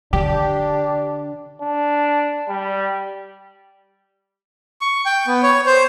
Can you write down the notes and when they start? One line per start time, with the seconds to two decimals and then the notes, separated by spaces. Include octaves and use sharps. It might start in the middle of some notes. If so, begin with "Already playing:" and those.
0.13 D3 D4 G4
1.61 D4
2.48 G3
4.81 C#6
5.06 G5
5.27 B3
5.43 C#5
5.66 C5